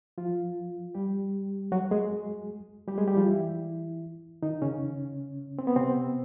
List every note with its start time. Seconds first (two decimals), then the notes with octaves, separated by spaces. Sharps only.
0.18 F3 F4
0.95 G3 G4
1.72 F#3 F#4
1.91 G#3 G#4
2.88 G3 G4
2.97 G#3 G#4
3.07 G3 G4
3.17 F3 F4
3.27 E3 E4
4.42 D#3 D#4
4.62 C#3 C#4
5.59 C4
5.67 B3
5.76 C3 C4